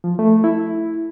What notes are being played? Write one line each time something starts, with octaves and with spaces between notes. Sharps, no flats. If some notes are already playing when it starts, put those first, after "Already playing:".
F3
A3
E4